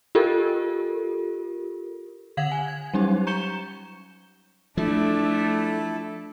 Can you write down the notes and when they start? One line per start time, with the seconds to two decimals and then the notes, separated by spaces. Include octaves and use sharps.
0.15 F4 G4 A4 A#4
2.37 D3 F5 F#5 G#6 F#7
2.52 G#5
2.68 G#6
2.94 F#3 G3 C#4 D#4 G4
3.27 A#5 C#6 G6 C#7 E7 G7
4.77 F3 A3 D4 E4 A4